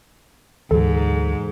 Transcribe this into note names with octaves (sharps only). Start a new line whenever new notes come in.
D2 G#2 E3 F#3 A4